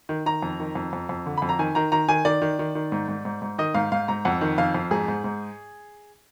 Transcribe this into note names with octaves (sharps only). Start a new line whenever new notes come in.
D#3
D#3 A#5
F2
D#3
F2
F2
F2
D3
F2 B5
A#5
D#3 G#5
D#3 A#5
D#3 A#5
D#3 G#5
D#3 D5
D#3
D#3
D#3
G#2
G#2
G#2
G#2
D#3 D#5
G#2 F5
G#2 F5
G#2 A#5
F2 F#5
D#3
F2 F5
F2
G#2 G#4
G#2
G#2